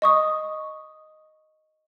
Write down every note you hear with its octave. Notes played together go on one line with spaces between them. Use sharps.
D#5 C#6 D#6